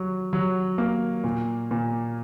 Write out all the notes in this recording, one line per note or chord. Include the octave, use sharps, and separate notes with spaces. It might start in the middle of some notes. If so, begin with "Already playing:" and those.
Already playing: F#3
F#3
A#3
A#2
A#2